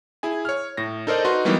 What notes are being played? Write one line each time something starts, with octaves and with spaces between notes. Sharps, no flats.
E4 G#4 G#5
C#5 F6
A2 A#6
D#4 A4 A#4 C5 D5 D#5
D#4 F#4 B4 C6
E3 F#3 G3 A#3 B3 D#4